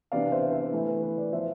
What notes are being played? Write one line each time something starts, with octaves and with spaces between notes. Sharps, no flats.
C3 E3 B3 D4 D5 F5
C5 E5
C5 E5
E3 A3 E4
B4
B4
B4 D5
F3 B3 C5 E5